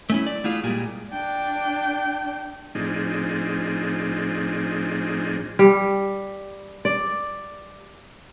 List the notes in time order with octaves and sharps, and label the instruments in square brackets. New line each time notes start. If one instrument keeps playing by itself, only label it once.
[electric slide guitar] A3 C#4 E4
D5
A3 E4 F4 G#4
A#2 G3 G#3
[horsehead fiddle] D4 G5
[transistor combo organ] A2 F3 C4 D4 D#4 G#4
[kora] G3
D5